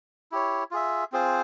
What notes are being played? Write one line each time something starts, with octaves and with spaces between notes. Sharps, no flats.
E4 G4 C#5
F4 G#4 E5
C4 F4 G#4 C5